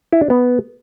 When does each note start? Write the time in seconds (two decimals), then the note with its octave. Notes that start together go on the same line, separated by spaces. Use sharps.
0.12 E4
0.21 D4
0.30 B3